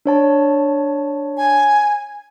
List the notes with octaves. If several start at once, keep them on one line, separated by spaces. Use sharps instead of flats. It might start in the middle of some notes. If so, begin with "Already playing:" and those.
D4 C#5 A5
G#5